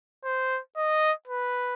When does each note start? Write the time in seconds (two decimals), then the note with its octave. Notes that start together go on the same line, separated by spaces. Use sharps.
0.25 C5
0.77 D#5
1.27 B4